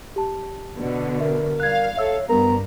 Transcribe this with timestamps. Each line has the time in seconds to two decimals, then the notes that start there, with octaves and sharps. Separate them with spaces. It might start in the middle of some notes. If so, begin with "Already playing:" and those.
0.16 G4 A5
0.77 B2 D3
1.20 A#4 E5
1.60 G3 F5 F#6 G#6
1.97 A4 C#5 E5 E6 G#6
2.29 G2 B3 A#4 A#5